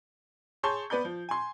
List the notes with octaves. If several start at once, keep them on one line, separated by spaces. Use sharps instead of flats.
G#4 C#5 A5 C6 C#6 G6
B3 B4 D5 B5 G6
F3
G#5 C6